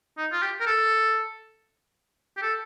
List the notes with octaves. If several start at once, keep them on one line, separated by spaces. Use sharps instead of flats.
D#4
F4
G4
A#4
A4
G4
A4